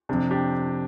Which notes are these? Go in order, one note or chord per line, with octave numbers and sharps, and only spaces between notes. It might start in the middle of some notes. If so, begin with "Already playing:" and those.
F2 C3 D4
D4 G4